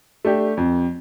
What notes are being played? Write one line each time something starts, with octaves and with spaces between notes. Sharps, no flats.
A3 D4 G4
F2